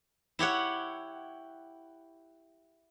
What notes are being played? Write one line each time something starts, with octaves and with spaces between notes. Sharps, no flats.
E4 G4 C#5 F#5